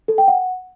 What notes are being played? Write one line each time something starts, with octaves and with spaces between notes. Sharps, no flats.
A4
G5
F#5